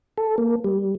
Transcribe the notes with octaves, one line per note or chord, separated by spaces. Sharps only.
A4
A#3
G3